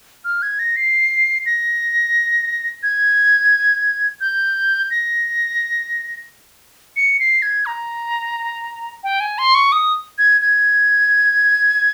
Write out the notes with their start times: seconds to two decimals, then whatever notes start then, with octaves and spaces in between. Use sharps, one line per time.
0.25 F6
0.42 G#6
0.59 A#6
0.76 C7
1.46 A#6
2.83 G#6
4.21 G6
4.91 A#6
6.96 C#7
7.20 C7
7.42 G#6
7.66 A#5
9.04 G5
9.20 G#5
9.38 C6
9.55 C#6
9.72 D#6
10.18 G#6
10.41 G#6